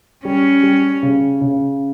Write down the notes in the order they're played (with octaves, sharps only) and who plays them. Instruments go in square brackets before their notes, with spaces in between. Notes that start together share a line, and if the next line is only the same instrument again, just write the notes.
[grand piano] G3 [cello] C#4
[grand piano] G3
C#3
C#3